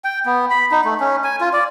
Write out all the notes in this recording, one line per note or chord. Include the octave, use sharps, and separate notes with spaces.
G5
B3
B5
D#4
A3
C#4
G#5
F4
D5